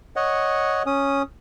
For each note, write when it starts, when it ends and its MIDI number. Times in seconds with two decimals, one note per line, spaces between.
0.16 0.83 73
0.16 0.83 75
0.16 0.83 78
0.86 1.22 61
0.86 1.22 87